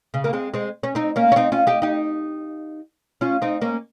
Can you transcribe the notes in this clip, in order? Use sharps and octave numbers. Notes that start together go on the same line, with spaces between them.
C#3
A#3
G#3 C4
G#3 C4
C#4
C4 D#4
A#3 C#4
C#4
C4 D#4
C#4 F4
D#4 G4
D#4 G4
C#4 F4
C4 D#4
A#3 C#4